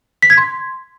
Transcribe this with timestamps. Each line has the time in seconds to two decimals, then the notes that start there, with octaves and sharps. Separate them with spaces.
0.22 B6
0.30 G#6
0.37 C6